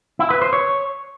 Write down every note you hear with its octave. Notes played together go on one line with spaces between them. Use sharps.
E4
B4
C5
C#5